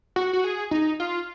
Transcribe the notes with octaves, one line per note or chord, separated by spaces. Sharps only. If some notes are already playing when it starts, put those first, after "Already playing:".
F#4
F#4
G#4
D#4
F4